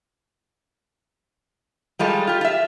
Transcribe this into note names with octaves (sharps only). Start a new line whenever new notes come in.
G3 G#3 F4 A4
F4 G4
F4 E5